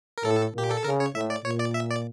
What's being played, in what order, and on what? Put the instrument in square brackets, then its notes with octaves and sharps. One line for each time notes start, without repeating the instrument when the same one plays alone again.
[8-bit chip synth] A#4
[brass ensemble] A2 [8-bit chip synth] A4
[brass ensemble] A#2 [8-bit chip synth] G4
[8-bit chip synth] A4
[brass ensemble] C#3 [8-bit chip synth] A#4
[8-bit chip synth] C#5
[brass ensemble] A2 [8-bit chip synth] E5
[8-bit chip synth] D5
[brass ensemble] A#2 [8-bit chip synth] C#5
[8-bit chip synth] D5
E5
D5